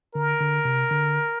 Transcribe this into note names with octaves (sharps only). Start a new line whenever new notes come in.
D3 A#4
D3
C3
D3